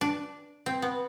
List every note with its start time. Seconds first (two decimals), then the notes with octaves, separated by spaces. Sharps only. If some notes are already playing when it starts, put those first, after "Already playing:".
0.01 D4
0.66 C4
0.82 B3